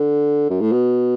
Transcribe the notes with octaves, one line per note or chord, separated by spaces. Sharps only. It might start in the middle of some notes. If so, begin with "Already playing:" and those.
Already playing: D3
F#2
A2
B2